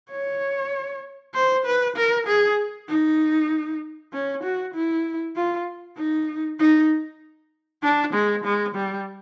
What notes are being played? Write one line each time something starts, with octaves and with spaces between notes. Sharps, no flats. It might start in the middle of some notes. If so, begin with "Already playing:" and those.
C#5
C5
B4
A#4
G#4
D#4
C#4
F#4
E4
F4
D#4
D#4
D4
G#3
G#3
G3